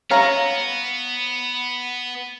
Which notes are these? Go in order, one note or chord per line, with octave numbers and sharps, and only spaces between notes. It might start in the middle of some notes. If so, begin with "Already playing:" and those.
B3 C#5 F5 A#5